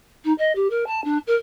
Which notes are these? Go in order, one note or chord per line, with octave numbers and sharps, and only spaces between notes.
D#4
D#5
G4
A#4
A5
D4
A#4